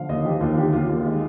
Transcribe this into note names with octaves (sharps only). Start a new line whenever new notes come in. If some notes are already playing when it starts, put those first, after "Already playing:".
Already playing: D3 F3 F5
D#2 D#5
F3 G4
D#2 F4
D3 G4
D#2 F4
D#2
G#3